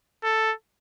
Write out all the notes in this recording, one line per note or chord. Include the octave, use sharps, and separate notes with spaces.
A4